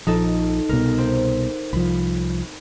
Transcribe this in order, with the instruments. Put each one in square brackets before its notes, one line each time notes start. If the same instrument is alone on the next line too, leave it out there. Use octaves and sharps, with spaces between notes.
[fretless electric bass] A#1 F3 [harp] D#4 A4
[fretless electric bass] C2 B2 [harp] A#4
[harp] C4
[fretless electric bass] C2 F3 [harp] B5